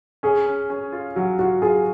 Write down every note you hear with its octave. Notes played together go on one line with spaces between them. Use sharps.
C#4 G#4
C#4
C#4
F4
F#3 F#4
F4 F#4
F4 G#4